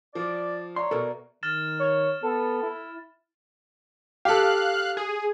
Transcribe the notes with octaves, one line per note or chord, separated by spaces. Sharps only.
F3 D5
C#5 D5 E5 A#5 C6
B2 A4 A#4
D#3 F6 A6 E7
C#5
B3 A4
E4
G4 A4 F5 F#6
G#4